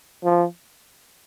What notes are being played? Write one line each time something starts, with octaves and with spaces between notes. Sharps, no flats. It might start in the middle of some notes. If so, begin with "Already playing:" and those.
F3